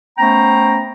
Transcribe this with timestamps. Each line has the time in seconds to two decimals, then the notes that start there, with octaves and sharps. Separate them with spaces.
0.18 A3 B3 C#4 C5 G5 A#5